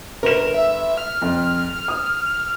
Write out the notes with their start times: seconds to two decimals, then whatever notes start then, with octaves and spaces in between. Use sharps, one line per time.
0.23 G1 A#4 E7
0.54 E5
0.97 F6
1.22 F2
1.88 D#6